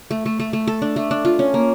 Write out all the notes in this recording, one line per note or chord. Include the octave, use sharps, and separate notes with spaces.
A3
A3
A3
A3
A4
D4
A3
D4
F4
C#4
A#3